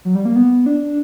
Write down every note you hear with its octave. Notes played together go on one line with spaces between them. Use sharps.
F#3
G3
A#3
B3
D4